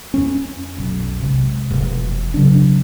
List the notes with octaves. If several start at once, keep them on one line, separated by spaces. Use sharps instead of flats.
F2 C#4
B1
C3 G#3
F1 B2 E3
C#3 F#3 C4 D4